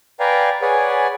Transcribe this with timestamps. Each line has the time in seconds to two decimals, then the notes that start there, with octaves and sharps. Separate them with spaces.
0.20 B4 D5 F5 G5 G#5 A#5
0.62 G#4 B4 C#5 D5 F#5 G#5